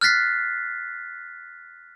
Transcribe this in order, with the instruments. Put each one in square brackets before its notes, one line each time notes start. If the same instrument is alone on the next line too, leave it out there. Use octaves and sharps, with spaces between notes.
[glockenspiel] F6 F#6 A6 B6 C7